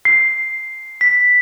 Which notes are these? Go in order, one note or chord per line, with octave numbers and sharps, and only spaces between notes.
C7
B6